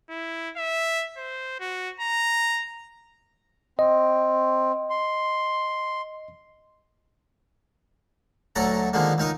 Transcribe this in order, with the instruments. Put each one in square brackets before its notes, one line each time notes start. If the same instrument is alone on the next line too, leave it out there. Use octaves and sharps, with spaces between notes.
[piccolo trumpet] E4
E5
C5
F#4
A#5
[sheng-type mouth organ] C4 [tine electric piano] D#5
[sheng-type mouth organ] C6
[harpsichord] D2 F#3 A4 F#5 A#5
D3 D#3 F3 G#3 A#3
C#2 D#4 A#4 D#6